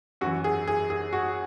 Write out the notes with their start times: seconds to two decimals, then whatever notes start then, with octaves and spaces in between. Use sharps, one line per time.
0.21 F#2 F#4
0.25 E3
0.44 G#4
0.68 G#4
0.90 G#4
1.13 F#4